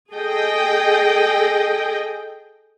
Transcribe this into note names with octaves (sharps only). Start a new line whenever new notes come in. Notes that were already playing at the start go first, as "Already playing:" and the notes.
G#4 A4 D#5 G5